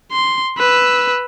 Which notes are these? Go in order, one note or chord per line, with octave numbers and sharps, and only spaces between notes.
C6
B4 E6